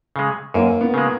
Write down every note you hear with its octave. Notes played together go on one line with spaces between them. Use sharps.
C#3 G#3
F#2 A#3
B3
C#3 G#3